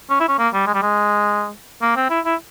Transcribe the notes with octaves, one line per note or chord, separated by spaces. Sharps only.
C#4
E4
C#4
A#3
G3
G#3
G3
G#3
A#3
C4
E4
E4